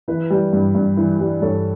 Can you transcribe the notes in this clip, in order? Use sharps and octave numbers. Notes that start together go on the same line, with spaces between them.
E3 B4
G3
G2
G2
E3
G3
G2 A4 C#5